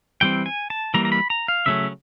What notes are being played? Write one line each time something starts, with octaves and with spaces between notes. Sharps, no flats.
E3 G3 C4 G5
G#5
A5
E3 G3 A#3 A#5
A#5
B5
A#5
F5
C#3 F#3 A3 C#4 E5